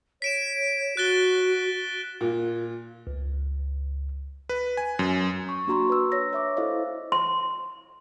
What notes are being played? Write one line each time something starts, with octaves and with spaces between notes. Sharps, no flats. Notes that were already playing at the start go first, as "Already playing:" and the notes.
C#5 B6 D7 E7
F#4 F#6 A6 G7
A#2
C#2
B4
G#5
F#2
C#6
A#3 D4 F#4 A#5 C6 C#6
B4 E6
C#5 E6 A#6
C#5 E5 D6
E4 A4 C5 D#5 F5
C6